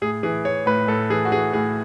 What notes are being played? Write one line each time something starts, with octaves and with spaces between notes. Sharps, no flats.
A2 G#4
E3 G#4
E3 C#5
A2 B4
A2 A4
E3 G#4
F#4
E3 G#4
A2 G#4